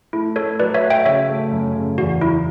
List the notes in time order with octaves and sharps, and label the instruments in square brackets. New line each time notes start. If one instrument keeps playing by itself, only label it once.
[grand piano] A3 [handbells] E4
[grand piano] A3 [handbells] A4 C#5
[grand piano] F#3 [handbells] B4 D5
[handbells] C#5 E5
[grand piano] F#4
[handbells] E5 G5
[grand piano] C#3 [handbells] C#5 E5
[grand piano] A3
F#2
C#3
[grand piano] E2 [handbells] F#4
[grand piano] F#3 [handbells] E4